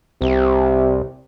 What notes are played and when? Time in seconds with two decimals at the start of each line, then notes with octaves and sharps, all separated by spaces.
0.21 C2 C3